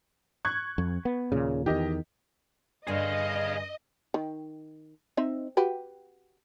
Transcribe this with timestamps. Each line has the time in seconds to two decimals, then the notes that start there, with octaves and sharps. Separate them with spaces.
0.45 C#6 F#6 G#6
0.78 F2
1.05 B3
1.32 D#2 A#2 C#3
1.66 E2 D#3 G4 D#5
2.87 G2 D3 G#4 D#5 F5
4.14 D#3
5.17 C4 D#4 E5
5.57 F#4 G4 B4